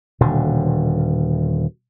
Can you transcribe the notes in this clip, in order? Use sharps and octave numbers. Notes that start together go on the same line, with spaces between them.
D#1 B2 D3